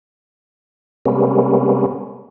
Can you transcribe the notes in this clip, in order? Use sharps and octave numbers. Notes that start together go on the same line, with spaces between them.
C3 G3 G#3 A#3 B3 C#4